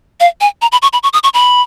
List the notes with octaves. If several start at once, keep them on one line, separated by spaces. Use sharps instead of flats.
F5
G#5
A#5
B5
C#6
B5
C#6
D#6
C#6
B5